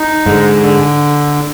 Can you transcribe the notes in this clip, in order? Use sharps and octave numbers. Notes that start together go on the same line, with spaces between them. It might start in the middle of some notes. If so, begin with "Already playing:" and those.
Already playing: D#4
G#2 D3
D3